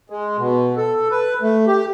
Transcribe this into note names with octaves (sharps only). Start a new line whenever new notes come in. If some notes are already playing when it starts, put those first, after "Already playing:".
G#3
B2
A4
B4
A3
G4